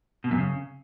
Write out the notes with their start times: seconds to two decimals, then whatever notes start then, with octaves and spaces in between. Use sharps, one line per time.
0.24 B2
0.31 F#2
0.38 C#3